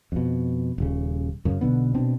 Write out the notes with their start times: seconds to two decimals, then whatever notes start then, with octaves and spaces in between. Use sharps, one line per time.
0.12 F2 B2
0.78 D#1 C#3
1.45 F#2 C#3
1.61 B1 B2 D3 B3
1.94 B2 C4 D4